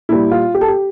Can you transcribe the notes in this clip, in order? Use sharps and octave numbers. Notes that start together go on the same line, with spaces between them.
A#2 G3 E4
F4
G4
A4
G4